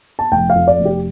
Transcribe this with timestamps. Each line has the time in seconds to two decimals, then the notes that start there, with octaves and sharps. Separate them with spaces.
0.19 A5
0.32 F1 G5
0.50 F5
0.55 F2
0.68 D5
0.79 F1
0.85 G4